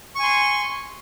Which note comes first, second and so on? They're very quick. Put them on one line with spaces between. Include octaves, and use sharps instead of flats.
C#6 G#5 C6